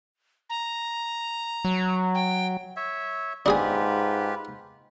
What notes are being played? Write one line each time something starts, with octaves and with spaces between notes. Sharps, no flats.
A#5
F#3
G5
C#5 E5
G#2 D4 F4 G4 G#4 B4 G#5